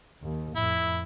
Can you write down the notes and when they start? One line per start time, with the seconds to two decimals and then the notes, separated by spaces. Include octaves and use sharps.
0.20 D#2
0.56 F2 A2 E4